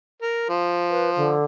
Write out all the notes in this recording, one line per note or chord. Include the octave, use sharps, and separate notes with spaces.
A#4
F3
B4
D3